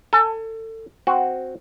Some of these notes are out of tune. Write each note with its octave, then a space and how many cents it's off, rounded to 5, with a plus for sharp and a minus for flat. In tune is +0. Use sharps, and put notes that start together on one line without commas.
A4 +25 G#5 +15
C4 +0 F#4 +0